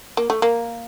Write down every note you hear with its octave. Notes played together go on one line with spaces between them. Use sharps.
A#3
A3
A#3